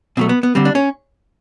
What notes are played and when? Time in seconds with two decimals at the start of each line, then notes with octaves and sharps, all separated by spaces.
0.17 B2 F#3 A3 C4
0.29 B3
0.43 B3
0.55 D3 G3 C4
0.65 D4
0.75 C#4